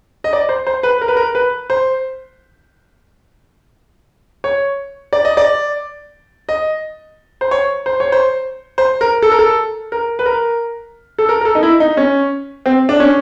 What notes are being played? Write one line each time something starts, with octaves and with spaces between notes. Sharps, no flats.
D#5
D5
C5
C5
B4
A#4
B4
A#4
B4
C5
C#5
D5
D#5
D5
D#5
C5
C#5
C5
C#5
C5
C5
A#4
A4
A#4
A4
A#4
B4
A#4
A4
A#4
A#4
A4
D#4
E4
D#4
C#4
C4
D4
C#4